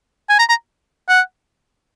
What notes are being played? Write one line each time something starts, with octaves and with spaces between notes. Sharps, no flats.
G#5
A#5
A#5
F#5